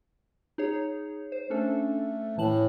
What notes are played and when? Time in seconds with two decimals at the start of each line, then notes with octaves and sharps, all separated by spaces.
0.58 D#4 G#4 C#5
1.32 C5
1.50 A3 C#4 D4 A4
2.38 A2 E3 A5 F#7